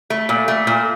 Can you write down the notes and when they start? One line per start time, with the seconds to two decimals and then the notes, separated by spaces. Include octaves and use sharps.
0.10 A3
0.29 A#2
0.48 A3
0.67 A#2